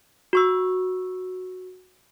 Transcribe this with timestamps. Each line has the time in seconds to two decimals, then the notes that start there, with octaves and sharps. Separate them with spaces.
0.33 F#4 C#6 E6